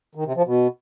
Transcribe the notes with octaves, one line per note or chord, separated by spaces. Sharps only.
D#3
C3
F3
B2